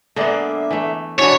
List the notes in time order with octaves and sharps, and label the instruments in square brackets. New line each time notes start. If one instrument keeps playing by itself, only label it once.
[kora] D3 B3 [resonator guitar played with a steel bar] G#3 A#3 D5 [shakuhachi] E5
[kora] E3 A3
[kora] B2 E3 [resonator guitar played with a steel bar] B3 D4 G#5 [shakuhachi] F#4 [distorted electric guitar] C#5